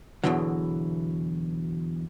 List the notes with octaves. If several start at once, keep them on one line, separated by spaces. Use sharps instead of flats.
E2 G2 B2 D3 E3 F#3